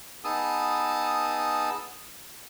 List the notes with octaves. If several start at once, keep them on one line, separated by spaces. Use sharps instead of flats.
B3 D#4 G#4 A5 D#6 E6